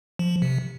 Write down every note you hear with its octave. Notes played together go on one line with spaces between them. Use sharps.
F3
C3